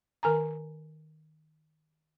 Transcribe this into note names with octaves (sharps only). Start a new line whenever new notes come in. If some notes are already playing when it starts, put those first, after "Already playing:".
D#3 A#4 G#5 A#5